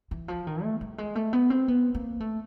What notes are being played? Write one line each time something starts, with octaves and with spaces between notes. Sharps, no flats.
E3
F3
D#3
A3
G3
G#3
A3
B3
C4
B3
A#3
A3